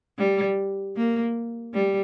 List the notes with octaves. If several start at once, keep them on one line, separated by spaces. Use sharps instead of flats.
G3
A#3
G3